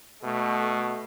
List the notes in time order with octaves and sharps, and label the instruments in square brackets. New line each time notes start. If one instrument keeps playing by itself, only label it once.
[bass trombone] B2 [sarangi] A3